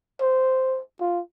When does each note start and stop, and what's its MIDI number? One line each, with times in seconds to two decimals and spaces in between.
0.21 0.81 72
1.01 1.21 65